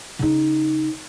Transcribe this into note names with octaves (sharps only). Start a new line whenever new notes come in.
C#3 D#4